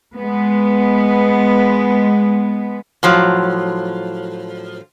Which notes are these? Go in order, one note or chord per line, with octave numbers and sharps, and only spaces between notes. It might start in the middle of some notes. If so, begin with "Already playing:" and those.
G#3 B3
A2 F3 F#3